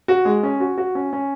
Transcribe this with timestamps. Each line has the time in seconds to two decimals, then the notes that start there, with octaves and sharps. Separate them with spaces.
0.08 F#4
0.25 G#3
0.43 C#4
0.60 F#4
0.78 F#4
0.95 C#4
1.13 C#4